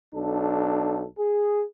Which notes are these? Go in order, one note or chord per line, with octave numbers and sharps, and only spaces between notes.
B1 D4 A4
G#4